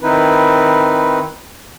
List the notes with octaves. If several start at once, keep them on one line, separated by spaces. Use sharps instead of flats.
D#3 C4 D#4 E4 B4